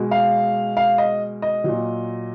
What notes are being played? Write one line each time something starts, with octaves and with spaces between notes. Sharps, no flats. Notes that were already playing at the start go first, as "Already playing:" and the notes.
Already playing: B2 G#3
F5
F5
D#5
D#5
A#2 F#3